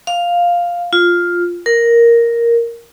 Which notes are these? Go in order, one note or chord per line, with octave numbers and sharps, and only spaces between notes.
F5
F4
A#4